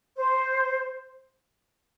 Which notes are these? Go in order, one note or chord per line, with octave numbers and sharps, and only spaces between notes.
C5